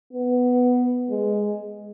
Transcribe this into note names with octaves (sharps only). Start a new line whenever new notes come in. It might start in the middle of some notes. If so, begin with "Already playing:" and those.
B3
G#3